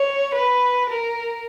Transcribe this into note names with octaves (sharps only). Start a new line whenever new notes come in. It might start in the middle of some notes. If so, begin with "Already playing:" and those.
Already playing: C#5
B4
A#4